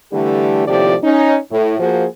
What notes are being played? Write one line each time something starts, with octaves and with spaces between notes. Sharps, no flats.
D3 E3 G3 A3 G4
D#2 A2 C3 F3 G4 D5
C#4 D#4
A2
F3 A#3 F#4 G#4 C5